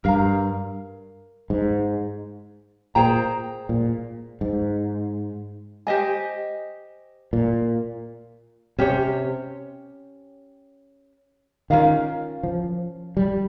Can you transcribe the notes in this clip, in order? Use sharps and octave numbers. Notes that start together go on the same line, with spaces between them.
G2 A#4 F5 A#5
G#2
A#2 G#4 C5 G5 A#5
A#2
G#2
G4 C5 D#5 G#5
A#2
C3 C#4 G4 C#5
D#3 C#4 F4 A#4 F5
F3
G3